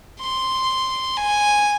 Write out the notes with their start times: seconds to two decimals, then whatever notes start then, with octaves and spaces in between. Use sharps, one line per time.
0.21 C6
1.17 G#5